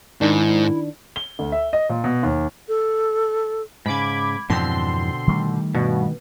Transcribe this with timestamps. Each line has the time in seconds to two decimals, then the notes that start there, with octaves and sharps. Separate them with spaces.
0.21 G#2 D#3 D4 E4
1.16 G7
1.39 D2
1.52 E5
1.73 D#5
1.89 A#2
2.04 B2
2.23 D#2
2.68 A4
3.86 G#2 C#3 B5 D6 G#6
4.50 F2 G#2 B2 D3 E3 C4 C6
5.27 D#3 G3 A3
5.75 G2 B2